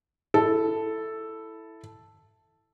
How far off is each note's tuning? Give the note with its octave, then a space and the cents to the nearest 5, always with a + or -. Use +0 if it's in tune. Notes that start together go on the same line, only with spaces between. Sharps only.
E4 +0 A4 +0